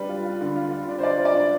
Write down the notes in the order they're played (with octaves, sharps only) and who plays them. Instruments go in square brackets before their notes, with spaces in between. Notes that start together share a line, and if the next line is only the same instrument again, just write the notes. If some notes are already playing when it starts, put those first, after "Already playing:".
Already playing: [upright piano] G3 D4 B4
F4
F4
D3
F4
F4
D4
C5
F4 D5
F4
D5
D4